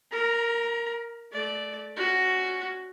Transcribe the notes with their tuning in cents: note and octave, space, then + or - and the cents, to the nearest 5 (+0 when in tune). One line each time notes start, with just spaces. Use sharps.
A#4 +0 A#5 +30
A3 -25 D5 +0
C#4 +0 F#4 +5